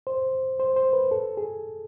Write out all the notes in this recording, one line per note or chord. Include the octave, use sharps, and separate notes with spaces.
C5
C5
C5
B4
A4
G#4